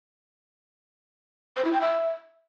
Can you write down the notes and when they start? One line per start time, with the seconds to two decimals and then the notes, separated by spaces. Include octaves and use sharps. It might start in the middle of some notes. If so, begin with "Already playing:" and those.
1.57 C5
1.65 E4
1.73 G5
1.81 E5